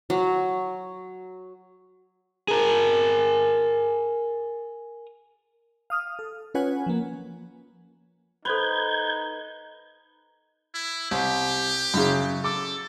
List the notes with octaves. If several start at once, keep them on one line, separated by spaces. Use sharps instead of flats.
F#3
G#4 A#4
F5 D#6 F6
A4
C#4 F4 B4 C#5 F#5 G#5
F3 A#3
D#4 A4 B4 C5 C6 G6 G#6
E4
C2 G4
F#2 C#3
A4 D6